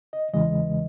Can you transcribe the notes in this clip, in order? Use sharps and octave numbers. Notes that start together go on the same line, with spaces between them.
D#5
E2 C#3 E3 G#3 D#5